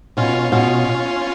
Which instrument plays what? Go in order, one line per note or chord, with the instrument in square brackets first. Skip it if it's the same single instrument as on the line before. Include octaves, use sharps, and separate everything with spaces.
[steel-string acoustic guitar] B2 [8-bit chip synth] C#4 F4
[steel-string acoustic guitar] B2 [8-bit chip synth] C#4 F4